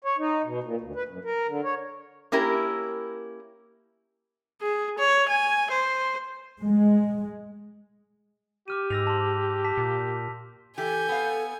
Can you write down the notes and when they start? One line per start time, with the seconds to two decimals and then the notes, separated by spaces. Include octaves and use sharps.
0.04 C#5
0.18 D#4
0.44 B2
0.64 A#2
0.81 D2
0.95 B4
1.08 F#2
1.24 A#4
1.48 D3
1.64 C#5
2.32 A#3 C#4 E4 G4 A#4
4.62 G#4
4.99 C#5
5.29 G#5
5.71 C5
6.60 G#3
8.68 G4 D6 F6 D#7
8.90 G#2 E6 A#6 F7
9.07 A5 C6
9.65 A5 B6
9.78 A#2
10.78 E3 G4 A4 G#5 G6
11.09 B3 F5